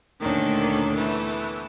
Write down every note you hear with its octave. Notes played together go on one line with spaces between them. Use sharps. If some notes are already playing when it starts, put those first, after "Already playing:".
D2 A#2 D3 D#3 C#4 D4
E3 A3 B3